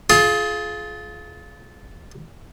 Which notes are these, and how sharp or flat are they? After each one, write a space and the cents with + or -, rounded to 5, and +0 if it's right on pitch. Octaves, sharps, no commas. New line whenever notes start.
F4 +0 G#4 +30